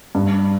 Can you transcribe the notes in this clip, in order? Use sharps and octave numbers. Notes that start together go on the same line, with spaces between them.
G2